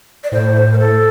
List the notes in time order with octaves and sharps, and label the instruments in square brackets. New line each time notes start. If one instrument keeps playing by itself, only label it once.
[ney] D5
[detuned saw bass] A2 [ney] C5
[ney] A#4
A4